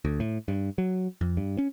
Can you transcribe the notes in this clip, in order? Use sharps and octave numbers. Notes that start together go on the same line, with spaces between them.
D2
A2
G2
F#3
F2
G2
C#4